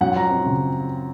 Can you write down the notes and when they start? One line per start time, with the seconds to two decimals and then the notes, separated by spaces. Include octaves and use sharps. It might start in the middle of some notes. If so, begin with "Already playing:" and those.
0.01 F#2 F#5
0.16 F3 A#5
0.31 C4
0.46 C#3